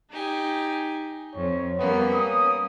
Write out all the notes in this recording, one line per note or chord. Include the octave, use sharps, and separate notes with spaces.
D#4 G4 G#5
F2 C#5
G3 A#3 B3 C#4
D#6